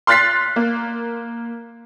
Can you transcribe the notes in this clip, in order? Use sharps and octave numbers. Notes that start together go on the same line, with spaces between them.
C6 F6 F#6 A6 B6 C7
A#3